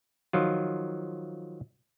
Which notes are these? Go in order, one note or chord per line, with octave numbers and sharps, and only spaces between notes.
D#3 F3 F#3 F4